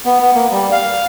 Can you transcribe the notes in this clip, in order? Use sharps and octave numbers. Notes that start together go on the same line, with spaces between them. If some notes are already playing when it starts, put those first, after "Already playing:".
B3
B3
A#3
G3
F5